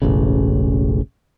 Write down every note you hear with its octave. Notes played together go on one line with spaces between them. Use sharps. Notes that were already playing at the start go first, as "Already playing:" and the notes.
E1 A1 C#3